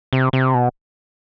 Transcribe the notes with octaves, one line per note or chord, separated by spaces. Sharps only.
C3
C3
B2